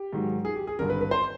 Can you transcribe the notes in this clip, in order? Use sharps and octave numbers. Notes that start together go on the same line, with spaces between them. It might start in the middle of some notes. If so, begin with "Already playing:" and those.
Already playing: G4
G#2 D#3 F#3
G#4
G4
G#4
G#1 G2 D3 A#4
B4
B4
C5